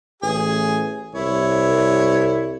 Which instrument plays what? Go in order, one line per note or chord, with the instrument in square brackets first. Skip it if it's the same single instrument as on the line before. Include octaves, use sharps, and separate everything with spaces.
[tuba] A1 [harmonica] G#4 G#5
[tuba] C2 [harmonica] E4 C#5